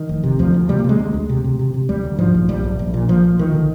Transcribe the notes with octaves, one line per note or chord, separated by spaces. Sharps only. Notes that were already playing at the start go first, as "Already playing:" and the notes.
Already playing: D#3
F1
C3
D2 F3
D2
C3 G3
A#3
C3 G#3
D2
D2
C3
C3
C3
C3
D2 G3
D2
G#2 F3
A#1
A#1 G3
A#1
A#1
A#2
A#2 F3
A#1
D2 D#3
D3